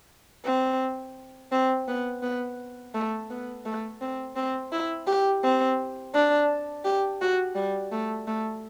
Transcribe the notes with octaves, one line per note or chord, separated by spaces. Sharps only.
C4
C4
B3
B3
A3
B3
A3
C4
C4
E4
G4
C4
D4
G4
F#4
G3
A3
A3